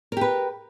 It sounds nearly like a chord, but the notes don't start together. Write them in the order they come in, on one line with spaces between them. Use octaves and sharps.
A#4 G4 B4